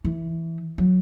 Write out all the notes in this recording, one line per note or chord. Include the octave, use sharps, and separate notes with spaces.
E3
F#3